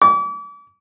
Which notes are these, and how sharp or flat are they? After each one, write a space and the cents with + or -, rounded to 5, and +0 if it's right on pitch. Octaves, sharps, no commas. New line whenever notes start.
D6 -40